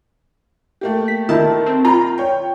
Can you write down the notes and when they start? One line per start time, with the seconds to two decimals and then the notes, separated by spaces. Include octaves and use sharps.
0.81 A3 A#3 G4
1.08 B6
1.29 D#3 E4 A5
1.66 C4
1.85 F4 A#5 B5
2.18 C#5 G5